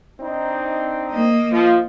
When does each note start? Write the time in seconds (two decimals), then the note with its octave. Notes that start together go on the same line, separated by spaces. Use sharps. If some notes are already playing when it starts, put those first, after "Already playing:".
0.19 C4 D4 D#4
1.12 A#3 D#5
1.52 F3